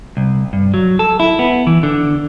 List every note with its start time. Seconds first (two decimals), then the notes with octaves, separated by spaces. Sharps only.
0.17 C2
0.53 G2
0.74 F#3
0.99 A4
1.20 E4
1.39 B3
1.67 E3
1.83 D3